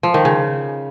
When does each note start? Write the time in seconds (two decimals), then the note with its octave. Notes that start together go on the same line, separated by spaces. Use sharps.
0.03 F3
0.14 D#3
0.25 C#3